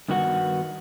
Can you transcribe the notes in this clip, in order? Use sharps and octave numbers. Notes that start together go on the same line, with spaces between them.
G2 D#3 B3 F#4 F#5